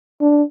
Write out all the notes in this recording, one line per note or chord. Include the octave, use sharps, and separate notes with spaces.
D4